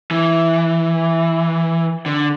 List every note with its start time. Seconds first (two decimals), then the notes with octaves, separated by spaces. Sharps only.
0.11 E3
2.06 D3